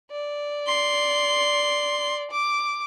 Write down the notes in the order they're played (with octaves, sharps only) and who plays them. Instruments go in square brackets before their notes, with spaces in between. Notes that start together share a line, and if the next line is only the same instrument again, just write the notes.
[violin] D5
[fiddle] C6
[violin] D6